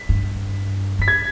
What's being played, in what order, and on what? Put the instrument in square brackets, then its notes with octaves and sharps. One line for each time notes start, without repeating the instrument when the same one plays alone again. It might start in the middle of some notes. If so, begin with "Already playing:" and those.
Already playing: [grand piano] B6
[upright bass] G2
[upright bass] G2 [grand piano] B6
[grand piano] G#6